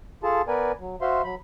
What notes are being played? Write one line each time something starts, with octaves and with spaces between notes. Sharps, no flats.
F4 G#4 A4 A5
B3 A#4 B4 D5 G#5
F#3
F#4 C5 E5 F5 C6
F#3 B5